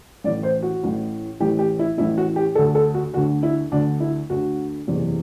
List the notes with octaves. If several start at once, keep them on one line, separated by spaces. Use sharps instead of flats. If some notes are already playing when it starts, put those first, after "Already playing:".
A1 A2 E3 D5
C5
F#4
A1 A2 E3
A1 A2 E3 G4
G4
E4
A1 A2 E3 E4
F#4
G4
D2 D3 A4
A4
F#4
D2 D3 F#4
E4
D2 D3 D4
E4
D2 D3 F#4
F#1 E2 C3 E3